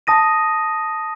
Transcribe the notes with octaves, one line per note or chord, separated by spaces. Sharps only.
A5 D#6 A#6 D#7